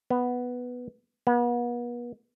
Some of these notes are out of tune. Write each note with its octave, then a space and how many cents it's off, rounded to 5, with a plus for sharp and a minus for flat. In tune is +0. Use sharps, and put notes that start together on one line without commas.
B3 +0
B3 -40